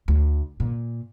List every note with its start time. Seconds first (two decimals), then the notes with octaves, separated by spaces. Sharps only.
0.08 D2
0.60 A#2